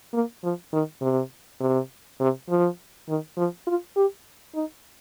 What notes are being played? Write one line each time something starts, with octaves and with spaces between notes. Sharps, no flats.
A#3
F3
D#3
C3
C3
C3
F3
D#3
F3
F4
G4
D#4